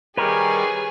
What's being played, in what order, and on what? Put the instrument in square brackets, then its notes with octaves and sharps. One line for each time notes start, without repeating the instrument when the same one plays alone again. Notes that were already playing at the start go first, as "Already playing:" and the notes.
[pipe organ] D#3 G3 G4 [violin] G#4 [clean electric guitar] A#4 [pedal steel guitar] B4 C#5